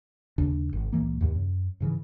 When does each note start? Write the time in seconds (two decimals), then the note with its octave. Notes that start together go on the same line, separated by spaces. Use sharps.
0.38 D#2 C#3 D4
0.73 G#1
0.92 C#2 A#2 E3 A#3
1.21 D#2 G#2 C3
1.35 F#2
1.80 G#2 C#3 E3